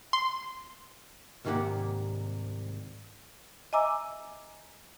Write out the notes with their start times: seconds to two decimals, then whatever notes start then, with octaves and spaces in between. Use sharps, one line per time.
0.13 C6
1.45 C2 G#2 D#3 A#3 G4 F#5
3.73 D#5 E5 G#5 A#5 D6 E6